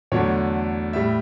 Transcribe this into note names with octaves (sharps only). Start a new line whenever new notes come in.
E2 D3 F#3 A3 C#5
A2 G3 E5